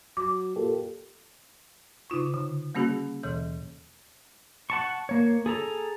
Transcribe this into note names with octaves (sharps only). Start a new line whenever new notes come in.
F#3 D6
A#2 G4 A4
C#3 D#4 F4 C#6
D3
G3 A#3 C#4 F#4 G#4
D#2 B2 E3 C#5 G6
F#5 A5 C#6
A#3 C#5
G#4 A4 A#5